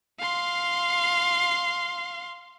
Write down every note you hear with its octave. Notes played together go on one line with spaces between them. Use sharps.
F5 C6